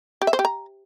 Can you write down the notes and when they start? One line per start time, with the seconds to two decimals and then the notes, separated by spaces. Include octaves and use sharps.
0.22 G4
0.27 E5
0.33 C5
0.39 G4
0.45 A#5